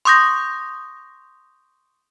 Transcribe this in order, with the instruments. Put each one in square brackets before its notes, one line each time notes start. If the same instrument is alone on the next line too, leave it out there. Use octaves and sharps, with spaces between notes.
[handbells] C6 C#6 D#6 G6 A#6